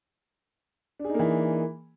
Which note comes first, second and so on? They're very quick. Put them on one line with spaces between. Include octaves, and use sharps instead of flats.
D4 G#4 D#4 A#3 E3